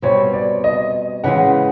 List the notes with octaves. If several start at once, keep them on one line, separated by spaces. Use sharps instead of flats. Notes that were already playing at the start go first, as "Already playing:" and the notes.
B2 G3 C4 C#5
D5
D#5
C#3 E3 G#3 F#5